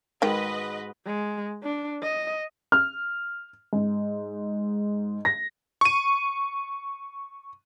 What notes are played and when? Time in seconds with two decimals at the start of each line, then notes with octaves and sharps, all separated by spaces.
0.22 G#2 D#3 F#4 B4 D#5 G5
1.06 G#3
1.63 D4
2.03 D#5
2.72 F6
3.73 G#2
5.25 A#6
5.81 C#6 D#7